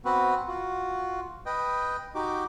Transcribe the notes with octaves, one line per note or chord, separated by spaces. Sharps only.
B3 C4 F#4 B4
F4 F#4
B4 D#5 G5
D#4 F#4 G4 D6